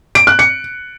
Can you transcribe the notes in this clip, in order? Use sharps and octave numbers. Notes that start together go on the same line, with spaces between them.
D7
F#6
C#7